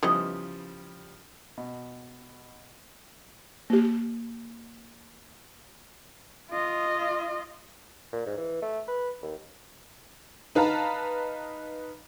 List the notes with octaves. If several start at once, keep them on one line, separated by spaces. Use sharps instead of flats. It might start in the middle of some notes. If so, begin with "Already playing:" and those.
C#3 E3 F3 G3 B3 D#5
B2
A#3 G4
F4 D#5
A#2
G#2
E3
A3
B4
D#2
D#4 B4 F5 A5 A#5